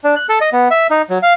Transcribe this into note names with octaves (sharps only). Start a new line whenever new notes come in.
D4
F#6
A4
D#5
B3
E5
D#4
F#3
F5